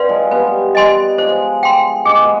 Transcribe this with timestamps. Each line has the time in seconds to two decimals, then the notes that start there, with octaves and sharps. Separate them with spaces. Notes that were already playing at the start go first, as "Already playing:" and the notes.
Already playing: C4 B4 D5 F5 C6
0.09 F3 G#3
0.31 G3 B3 B4
0.75 D#5 G#5 C6
1.18 F3 G#3 C5
1.63 G5 C6
2.05 G#3 G#4
2.16 B3
2.25 G#3